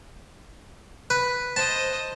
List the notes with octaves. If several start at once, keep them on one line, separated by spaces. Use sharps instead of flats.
B4
C5 D#5 A5